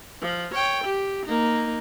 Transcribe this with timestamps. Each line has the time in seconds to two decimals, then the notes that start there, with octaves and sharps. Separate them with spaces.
0.22 F3
0.55 C#5 G5
0.84 G4
1.26 A#3 D#4